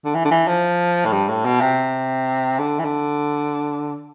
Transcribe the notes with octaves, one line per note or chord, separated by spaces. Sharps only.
D3
E3
D3
E3
F3
A2
G2
A2
B2
C3
D3
E3
D3